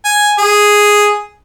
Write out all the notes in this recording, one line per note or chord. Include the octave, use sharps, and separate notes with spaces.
G#5
G#4